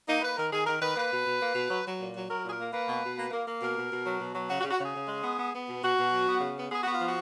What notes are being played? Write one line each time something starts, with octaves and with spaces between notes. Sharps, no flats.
A#3 D#4
A#3 B4
D#3 A#4
D#3 G#4
D#3 A#4
D#3 B4
A#3 B4
B2
B2
A#3
B2
F#3
F#3
A#2
F#3
F#3 A#4
A#2 G#4
A#4
A#3
A#3 B4
B2
B2
A#3
A#3
A#3
B2 A#4
B2
B2
F#3
B2
F#3
C#3 F#4
F#4
C#3
F#4
C#3 G#4
C#3
G#3
B3
B3
B3
B2
B2 F#4
B2
F#3
B3
C#3
B3
B3 G#4
B3 F#4
F4
F3 F#4